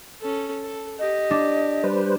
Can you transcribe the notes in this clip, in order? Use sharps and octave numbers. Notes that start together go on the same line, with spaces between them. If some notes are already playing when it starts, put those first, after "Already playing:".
C#4 A4
A4
G4 D#5
D4
G3 B4 C5